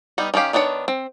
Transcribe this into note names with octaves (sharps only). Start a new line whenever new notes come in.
G3 B3 D#4
D#3 C#4 D4 G4 F5
D#3 B3 D4 F#4 C#5
C4